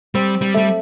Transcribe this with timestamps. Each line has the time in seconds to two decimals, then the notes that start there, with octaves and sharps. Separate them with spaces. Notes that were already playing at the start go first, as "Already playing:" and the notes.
0.15 G3 C4
0.42 G3
0.54 G3 A3